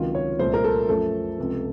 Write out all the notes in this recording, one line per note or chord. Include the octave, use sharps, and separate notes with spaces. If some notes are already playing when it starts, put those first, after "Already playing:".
Already playing: C#2 C3 D#3 F#3 F4
C#5
C2 A#2 A3 C5
A#4
A4
F#2 F3 A3 A4
C#2 C3 F3